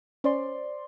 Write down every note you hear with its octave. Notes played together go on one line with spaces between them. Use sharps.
C#4 C5 D5 C6